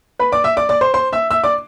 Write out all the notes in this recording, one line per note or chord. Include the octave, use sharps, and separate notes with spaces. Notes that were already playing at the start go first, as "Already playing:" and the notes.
B4 B5
D5 D6
E5 E6
D5 D6
D5 D6
C5 C6
C5 C6
E5 E6
E5 E6
D5 D6